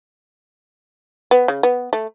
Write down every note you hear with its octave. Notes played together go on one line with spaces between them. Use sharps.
B3
C#3
B3
A3